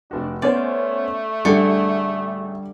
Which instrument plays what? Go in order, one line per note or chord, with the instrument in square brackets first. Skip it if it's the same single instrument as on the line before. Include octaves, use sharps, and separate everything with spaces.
[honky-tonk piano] F1 F#4 [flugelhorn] D4
[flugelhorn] A3 [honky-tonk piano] B3 C#4 C5 [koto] D5
[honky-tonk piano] A1 G#4 C#7 [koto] D3 [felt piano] G3